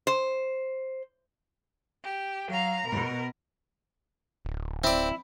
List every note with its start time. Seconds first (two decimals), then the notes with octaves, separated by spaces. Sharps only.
0.07 C5
2.02 G4
2.49 F#3 F5 A#5
2.86 B2 A#4
4.45 D1
4.84 C4 E4 D5